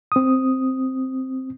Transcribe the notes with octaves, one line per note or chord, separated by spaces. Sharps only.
C4 D#6